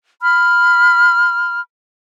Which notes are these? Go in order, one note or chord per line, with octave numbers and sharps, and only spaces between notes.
B5 F6